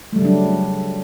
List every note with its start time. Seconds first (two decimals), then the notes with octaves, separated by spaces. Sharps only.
0.13 A3
0.16 G3
0.19 C#3
0.22 F#3
0.25 D4